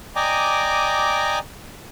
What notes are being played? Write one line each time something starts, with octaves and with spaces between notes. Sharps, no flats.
D5 D#5 G5 G#5 A#5 D6